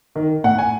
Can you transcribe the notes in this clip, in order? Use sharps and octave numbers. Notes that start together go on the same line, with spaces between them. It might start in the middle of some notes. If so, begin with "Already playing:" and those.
D#3
A2 F#5
G#5